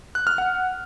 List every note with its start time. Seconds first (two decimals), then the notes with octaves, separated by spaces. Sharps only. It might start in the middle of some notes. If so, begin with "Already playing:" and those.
0.15 F#6
0.27 F6
0.38 F#5